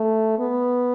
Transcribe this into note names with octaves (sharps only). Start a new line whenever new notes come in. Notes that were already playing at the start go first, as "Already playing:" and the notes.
Already playing: A3
B3